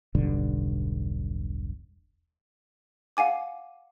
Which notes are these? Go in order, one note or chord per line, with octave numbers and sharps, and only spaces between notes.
E1 B1 G2 D3
F5 F#5 G#5 D6